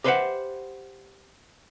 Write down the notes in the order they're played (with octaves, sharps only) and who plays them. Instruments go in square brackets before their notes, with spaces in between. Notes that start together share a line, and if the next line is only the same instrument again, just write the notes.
[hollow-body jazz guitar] G4 B4 C5 D#5 E5 F#5